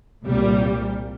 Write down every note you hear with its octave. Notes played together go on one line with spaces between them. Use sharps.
C2 A#2 G3